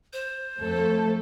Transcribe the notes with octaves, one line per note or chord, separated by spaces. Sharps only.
C5
F2 A3 A4